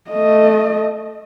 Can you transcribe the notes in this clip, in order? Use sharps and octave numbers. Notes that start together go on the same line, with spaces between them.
A3 D#5